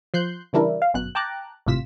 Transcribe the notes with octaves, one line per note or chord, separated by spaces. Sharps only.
F3 C6 F#6 G6
C#3 E3 G3 D4 E4 A#4
F5
G1 F#2 B2 F#6
G5 A5 A#5 D6 F#6
G#1 A2 C3 F4 B6 E7